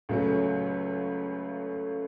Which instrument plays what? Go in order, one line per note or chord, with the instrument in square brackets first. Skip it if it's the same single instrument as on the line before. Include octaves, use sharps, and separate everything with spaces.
[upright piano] C#2 C#3 F#3 A3 C#4